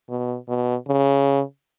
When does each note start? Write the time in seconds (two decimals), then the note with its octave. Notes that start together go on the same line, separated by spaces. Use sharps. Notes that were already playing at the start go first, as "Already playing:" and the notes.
0.09 B2
0.48 B2
0.87 C#3